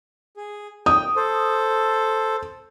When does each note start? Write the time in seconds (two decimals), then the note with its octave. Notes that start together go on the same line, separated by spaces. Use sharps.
0.37 G#4
0.86 G5 D#6
1.16 A4 C5